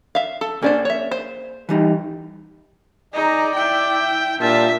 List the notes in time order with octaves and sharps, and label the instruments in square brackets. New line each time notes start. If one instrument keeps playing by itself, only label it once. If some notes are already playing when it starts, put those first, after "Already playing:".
[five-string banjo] E5 F5
A4
[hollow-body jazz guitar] A#3 G#4 D5 [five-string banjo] C#4 D4 C5
[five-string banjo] C#5 E5
C5
[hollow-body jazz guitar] E3 G3 D#4
[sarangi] D#4 [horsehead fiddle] G#4 A#5 [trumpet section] D5
[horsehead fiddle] E4 E5 [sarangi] G5
[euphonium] A#2 [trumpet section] G3 F4 A5 [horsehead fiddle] D4 [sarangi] E5